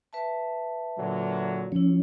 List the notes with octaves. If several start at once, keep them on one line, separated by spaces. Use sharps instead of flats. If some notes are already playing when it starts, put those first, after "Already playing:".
B4 E5 A5
A#2 D3 F#3
F3 C#4 E4 C#5